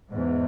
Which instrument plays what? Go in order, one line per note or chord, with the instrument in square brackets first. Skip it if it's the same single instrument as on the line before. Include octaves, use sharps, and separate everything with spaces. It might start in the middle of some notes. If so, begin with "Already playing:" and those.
[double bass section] E2 G#2